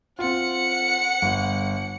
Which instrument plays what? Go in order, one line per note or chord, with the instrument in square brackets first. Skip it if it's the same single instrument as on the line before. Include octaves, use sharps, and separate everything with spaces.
[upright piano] C4 F4 [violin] F#5 C#7
[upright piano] G1